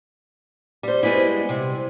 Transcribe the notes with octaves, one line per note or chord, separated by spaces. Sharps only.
G3 C5
G3 G#3 B3 E4
C3